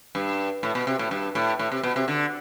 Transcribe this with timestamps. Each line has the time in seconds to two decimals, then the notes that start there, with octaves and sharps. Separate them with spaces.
0.15 G2
0.63 A2
0.75 B2
0.87 C3
0.99 A2
1.11 G2
1.35 A2
1.59 A2
1.72 C3
1.83 B2
1.96 C3
2.08 D3